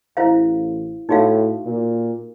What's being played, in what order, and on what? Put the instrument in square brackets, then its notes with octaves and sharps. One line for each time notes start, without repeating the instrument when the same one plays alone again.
[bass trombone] A1 [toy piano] E4 C5 F5
[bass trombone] A2 [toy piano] D#4 F#4 F5
[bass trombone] A#2